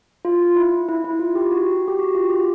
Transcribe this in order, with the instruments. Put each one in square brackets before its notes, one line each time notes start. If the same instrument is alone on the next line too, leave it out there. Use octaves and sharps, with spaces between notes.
[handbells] F4
E4
E4
E4
F4
G4
F#4
G4
F#4
F4
G4